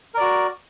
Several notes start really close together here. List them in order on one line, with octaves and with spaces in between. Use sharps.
A#4 D5 F#4